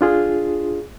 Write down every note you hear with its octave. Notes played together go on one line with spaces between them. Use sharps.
D4 F4 G#4